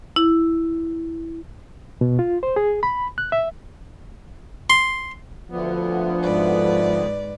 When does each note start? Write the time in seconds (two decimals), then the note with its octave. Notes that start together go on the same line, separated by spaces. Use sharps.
0.16 E4
2.01 B2
2.19 F4
2.43 C5
2.56 G#4
2.83 B5
3.18 F#6
3.32 E5
4.70 C6
5.51 D2 D3 F3 B3
6.23 G#2 B4 D5